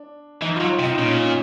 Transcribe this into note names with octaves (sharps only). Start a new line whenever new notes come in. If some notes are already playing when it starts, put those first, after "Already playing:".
Already playing: D4
E3 D#4
F#3 F4
C3
D#4
A#2 C#4
C#4